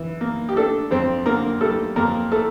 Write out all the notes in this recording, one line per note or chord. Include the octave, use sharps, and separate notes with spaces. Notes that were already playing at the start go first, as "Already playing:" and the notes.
Already playing: E3
A#3
G4
A3 D4 A4
F2 C4 C5
D3 A#3 A#4
G3 A3 A4
F2 A#3 A#4
A3 A4